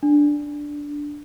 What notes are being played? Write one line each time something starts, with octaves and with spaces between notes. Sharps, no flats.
D4